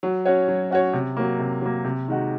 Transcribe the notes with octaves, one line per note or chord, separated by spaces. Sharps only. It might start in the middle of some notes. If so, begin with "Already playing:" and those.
F#3
C#4 F#4 C#5
F#3
C#4 F#4 C#5
C3
F#3 A#3
C3
F#3 A#3
C3
D#3 G#3 D#4 F#4